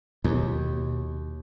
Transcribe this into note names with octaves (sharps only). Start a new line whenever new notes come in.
D#2 B2